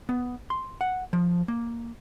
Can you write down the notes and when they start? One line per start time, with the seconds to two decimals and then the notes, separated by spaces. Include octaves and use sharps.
0.09 B3
0.50 C6
0.81 F#5
1.13 F3
1.48 A#3